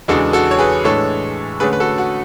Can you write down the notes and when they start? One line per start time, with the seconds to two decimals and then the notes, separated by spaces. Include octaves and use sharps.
0.08 E2 C#3 G#3 D4 F#4 A4
0.33 F#4 A4
0.51 C#5
0.59 G#4 B4
0.84 A2 E3 G#3 D4 A4 C#5
1.60 D3 A3 C#4 G#4 B4
1.73 B4
1.80 F#4 A4
1.98 F#4